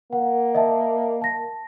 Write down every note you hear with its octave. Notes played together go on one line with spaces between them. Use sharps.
A#3 F#5
D#5 E5 A5
A5 A#6